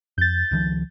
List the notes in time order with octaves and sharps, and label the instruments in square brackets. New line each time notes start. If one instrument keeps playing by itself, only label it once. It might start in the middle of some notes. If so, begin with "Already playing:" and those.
[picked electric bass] F2 [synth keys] G6 A6
[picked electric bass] C#2 D#3 F3